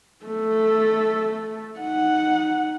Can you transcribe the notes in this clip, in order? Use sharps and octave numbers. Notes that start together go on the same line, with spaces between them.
A3 A4
D#4 F#5